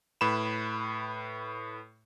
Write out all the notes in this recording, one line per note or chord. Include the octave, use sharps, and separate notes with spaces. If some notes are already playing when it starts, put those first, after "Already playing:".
A2 B4 B5 E7